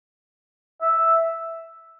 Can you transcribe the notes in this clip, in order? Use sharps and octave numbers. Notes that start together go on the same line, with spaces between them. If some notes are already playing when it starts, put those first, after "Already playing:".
E5